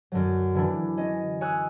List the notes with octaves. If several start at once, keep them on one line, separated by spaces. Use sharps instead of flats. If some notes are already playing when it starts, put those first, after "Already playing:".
F#2 D3 F#3
D3 E3 D4
C#4 D#5
C#5 G#5 D#6 E6 F#6